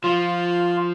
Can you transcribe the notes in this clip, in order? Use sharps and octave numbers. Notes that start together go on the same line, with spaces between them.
F3 F4